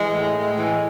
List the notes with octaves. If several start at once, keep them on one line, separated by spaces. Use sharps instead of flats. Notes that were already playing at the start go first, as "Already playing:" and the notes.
Already playing: E3 G#3
A2
A2 G#3
E3